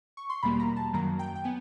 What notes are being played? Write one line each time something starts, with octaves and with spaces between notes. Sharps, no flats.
C#6
C6
E2 B2 G3 A#3 B5
A#5
A5
F#2 D#3 F#3 A#3 A#5
G5
G5
B3 G#5